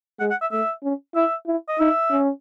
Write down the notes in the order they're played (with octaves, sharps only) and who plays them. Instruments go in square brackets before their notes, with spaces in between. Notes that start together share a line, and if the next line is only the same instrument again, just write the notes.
[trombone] G#3 [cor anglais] F#5
[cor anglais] F#5
E5
[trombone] A3 [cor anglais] E5
[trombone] C#4
[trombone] E4 [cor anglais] E5
[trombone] E4
[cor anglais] D#5
[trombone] D#4 [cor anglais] E5
[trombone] C#4